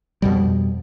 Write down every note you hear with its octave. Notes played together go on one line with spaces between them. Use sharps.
F2 B2 G3